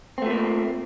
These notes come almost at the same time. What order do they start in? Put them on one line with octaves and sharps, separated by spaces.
C4 A3 A#2 A#3